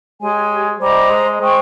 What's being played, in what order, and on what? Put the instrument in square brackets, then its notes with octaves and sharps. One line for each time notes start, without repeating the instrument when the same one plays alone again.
[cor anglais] G#3 [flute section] G4 C#5 G#5
[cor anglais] G3 [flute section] C5 D#5 A#5
[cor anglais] G#3
[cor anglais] G#3 [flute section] C5 G5 C#6